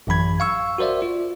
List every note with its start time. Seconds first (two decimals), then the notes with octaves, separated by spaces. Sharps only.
0.07 A1 F#2 E3 B5 G#6
0.40 F5 C#6 E6
0.78 F#4 A#4 C5 D5 E5
1.02 F4